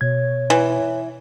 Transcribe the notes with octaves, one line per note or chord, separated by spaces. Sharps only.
B2 C#5 G#6
E3